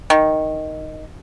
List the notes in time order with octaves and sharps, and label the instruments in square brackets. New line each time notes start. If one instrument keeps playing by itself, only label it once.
[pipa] D#3